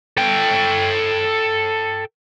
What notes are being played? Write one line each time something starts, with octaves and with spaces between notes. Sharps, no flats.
A4 G5